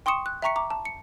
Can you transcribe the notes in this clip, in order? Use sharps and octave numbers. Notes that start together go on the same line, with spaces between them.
G5 C6 C#6 D#6 C#7 E7
F#6
E5 G5 A#5 C#6 B6 C#7
A#5 D6
A5
C#7